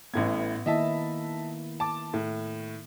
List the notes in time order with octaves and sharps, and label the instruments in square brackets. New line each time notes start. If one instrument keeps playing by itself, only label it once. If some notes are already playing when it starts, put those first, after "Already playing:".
[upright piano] A1 A2 G#6 [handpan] B3
[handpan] D#3 A#3 E4 [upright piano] D#5 E5 A5
[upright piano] A5 D6
A2